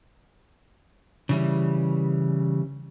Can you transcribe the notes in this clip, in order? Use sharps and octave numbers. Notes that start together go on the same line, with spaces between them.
C#3 E3 G3